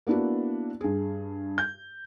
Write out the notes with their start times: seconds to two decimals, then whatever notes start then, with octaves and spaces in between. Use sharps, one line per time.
0.07 A#3 B3 D4 E4 F#4
0.81 G2 G#4
1.58 G6